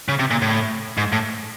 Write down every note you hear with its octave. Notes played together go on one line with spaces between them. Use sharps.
C#3
C3
A#2
A2
G#2
A2